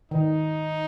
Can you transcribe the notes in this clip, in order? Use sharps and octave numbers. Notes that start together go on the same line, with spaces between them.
D#3 D#4